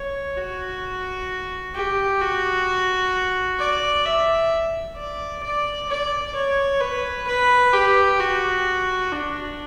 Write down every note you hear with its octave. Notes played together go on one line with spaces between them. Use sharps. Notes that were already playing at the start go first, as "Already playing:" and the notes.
Already playing: C#5
F#4
G4
F#4
D5
E5
D5
D5
D5
C#5
B4
B4
G4
F#4
D4